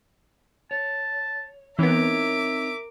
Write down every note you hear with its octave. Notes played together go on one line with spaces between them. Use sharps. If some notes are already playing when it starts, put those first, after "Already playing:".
C#5 A5
E3 B3 C4 D#4 A#4 C#5 E5 D6